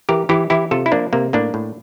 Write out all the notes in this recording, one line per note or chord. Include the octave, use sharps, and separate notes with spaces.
E3 G4 A#4
E3 E4 G4
E3 E4 G4
C3 F4 A4
E4
F3 A#3 D4
C3 A#3
A2 A#3 D4
A2